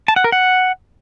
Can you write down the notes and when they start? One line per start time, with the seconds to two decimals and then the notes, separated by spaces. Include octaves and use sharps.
0.08 A5
0.16 F#5
0.24 A#4
0.32 F#5